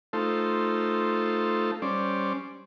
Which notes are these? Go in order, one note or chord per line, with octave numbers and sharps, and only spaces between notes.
A3 D#4 F4 A4 C5
G3 C#4 C5 D5